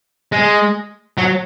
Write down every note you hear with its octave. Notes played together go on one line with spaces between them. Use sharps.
G#3
F#3